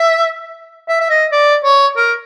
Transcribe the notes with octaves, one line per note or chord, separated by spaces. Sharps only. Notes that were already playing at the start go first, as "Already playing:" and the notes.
Already playing: E5
E5
E5
D#5
D5
C#5
A#4